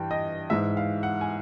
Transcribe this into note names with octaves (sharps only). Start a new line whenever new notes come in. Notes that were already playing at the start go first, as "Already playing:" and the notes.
Already playing: G2 E3 G5
D#5
G#2 E3 G#3 E5
F5
F#5
G#5